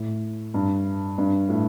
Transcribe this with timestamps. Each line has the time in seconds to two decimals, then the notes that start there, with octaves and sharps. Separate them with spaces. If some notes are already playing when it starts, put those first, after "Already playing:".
Already playing: A2
0.54 G2
1.18 G2
1.49 A2